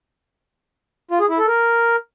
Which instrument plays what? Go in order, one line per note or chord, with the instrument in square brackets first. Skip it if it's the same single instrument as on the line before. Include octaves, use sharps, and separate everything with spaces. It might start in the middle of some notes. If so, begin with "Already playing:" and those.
[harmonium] F4
G#4
E4
A4
A#4